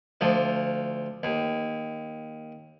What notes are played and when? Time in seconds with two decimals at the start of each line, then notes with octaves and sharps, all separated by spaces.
0.21 D2 F3
1.23 D#2